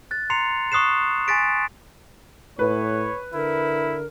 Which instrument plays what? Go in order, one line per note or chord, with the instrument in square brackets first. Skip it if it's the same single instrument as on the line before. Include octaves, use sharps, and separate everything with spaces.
[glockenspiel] F#6 A6
A#5 C6 C7 C#7 F7
C#6 D#6 F#6 C7 E7
G#5 C6 C#6 A6 B6 D7
[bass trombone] A2 [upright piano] B4 [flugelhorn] C#5
[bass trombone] D3 [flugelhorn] E4 [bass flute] A#4